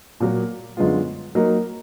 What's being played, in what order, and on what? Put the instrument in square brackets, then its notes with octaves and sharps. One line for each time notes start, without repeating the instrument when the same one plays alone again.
[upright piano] A#2 F#3 A#3
F#2 D3 G#3 B3 F4
F#3 A#3 D#4 A#4